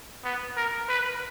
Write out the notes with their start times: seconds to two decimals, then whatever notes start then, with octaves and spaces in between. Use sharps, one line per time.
0.24 B3
0.57 A#4
0.88 B4